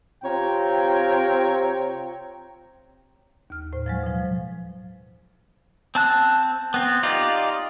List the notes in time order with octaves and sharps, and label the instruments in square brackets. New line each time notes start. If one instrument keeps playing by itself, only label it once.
[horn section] C3 C4 F4 C#5 G5 A#5
[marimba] D#2 F6
A2 C5
F3 F#3 G#3
B2 F3
[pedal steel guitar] C4 A5 F#6
B3 C4
D#4 F4 G4 D5